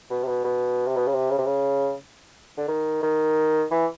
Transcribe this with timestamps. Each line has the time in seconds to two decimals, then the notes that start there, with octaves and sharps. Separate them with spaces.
0.10 B2
0.24 C3
0.28 B2
0.44 B2
0.87 C3
0.96 B2
1.07 C#3
1.13 C3
1.31 C#3
1.38 C3
1.46 C#3
2.57 D3
2.68 D#3
3.03 D#3
3.71 E3